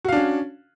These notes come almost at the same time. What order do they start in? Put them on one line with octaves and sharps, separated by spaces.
F#4 F5 D4 C#4